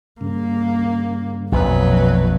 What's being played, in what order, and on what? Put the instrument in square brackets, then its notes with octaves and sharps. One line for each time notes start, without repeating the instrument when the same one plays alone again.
[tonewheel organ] G2 C#3 [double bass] A#3
[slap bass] A#1 F2 [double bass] B2 F#3 [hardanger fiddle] B4